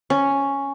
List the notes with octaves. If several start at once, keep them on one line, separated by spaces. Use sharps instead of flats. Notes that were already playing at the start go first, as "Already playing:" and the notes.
C#4